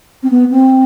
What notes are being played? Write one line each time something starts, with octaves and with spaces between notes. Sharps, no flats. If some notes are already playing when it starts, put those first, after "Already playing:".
C4
B3
C4